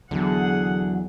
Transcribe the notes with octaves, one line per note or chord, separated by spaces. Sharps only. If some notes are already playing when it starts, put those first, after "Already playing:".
E2 D3 F#3 G#4 F#5